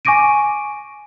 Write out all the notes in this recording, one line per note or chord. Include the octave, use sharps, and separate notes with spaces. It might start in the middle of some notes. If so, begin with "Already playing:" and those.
G#5 C#6 D6 A#6 D7 D#7